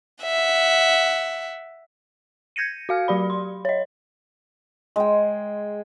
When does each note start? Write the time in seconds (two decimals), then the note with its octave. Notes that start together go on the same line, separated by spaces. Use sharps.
0.23 E5 F#5
2.56 G6 G#6 A#6 C#7 D#7
2.89 F#4 F5 F6
3.08 F#3 G4 D5 B5
3.30 C6
3.65 C#5 D#5
4.96 G#3 G5